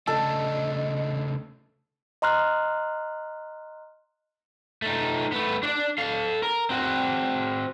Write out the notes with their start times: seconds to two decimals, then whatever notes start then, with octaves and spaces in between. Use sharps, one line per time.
0.07 C#3 A3 D4 A4 D#5
2.22 D#5 A#5 C6 F6 F#6
4.82 A3 D#4
5.32 A3 B3
5.63 D4 D5
5.98 A4 F5
6.43 A#4
6.70 C4 F#4